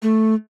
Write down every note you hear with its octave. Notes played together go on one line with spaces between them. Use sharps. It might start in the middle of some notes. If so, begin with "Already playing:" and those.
A3